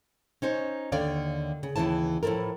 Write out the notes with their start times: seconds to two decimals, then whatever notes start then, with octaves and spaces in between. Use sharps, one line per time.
0.42 C#4 D#4 C5 C#5
0.92 D#2 D3 C#5 D5 F5
1.63 C#3
1.76 D#2 C#3 E3 E4 A5
2.23 A2 F3 E4 A4 A#4